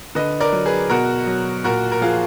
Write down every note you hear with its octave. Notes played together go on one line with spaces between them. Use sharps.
D3 B4 D#5
A#4 D5
F#3
G#4 B4
B2 F#4 A#4
F#3
A#2 F#4 A#4
A#4
F3 F4 G#4